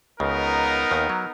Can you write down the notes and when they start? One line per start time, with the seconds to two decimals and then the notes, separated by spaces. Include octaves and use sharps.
0.19 C#2 C#3 B3 D#4 A#4
0.91 D#2 D#3
1.09 F#3